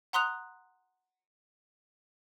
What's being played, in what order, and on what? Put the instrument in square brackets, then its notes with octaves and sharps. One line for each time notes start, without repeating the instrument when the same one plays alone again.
[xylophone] F#5 A#5 C6 D#6 F#6 F7